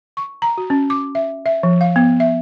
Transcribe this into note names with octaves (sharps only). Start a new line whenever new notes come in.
C#6
A#5
F#4
C#4
D6
E5
E5
F3
F5
B3
E5